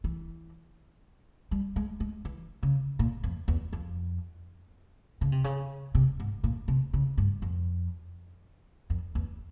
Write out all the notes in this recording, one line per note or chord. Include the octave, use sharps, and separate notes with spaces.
E3
G3
G#3
G#3
E3
C#3
A#2
F2
E2
F2
C#3
C3
C#3
C3
G#2
A#2
C3
C#3
G2
F2
F2
E2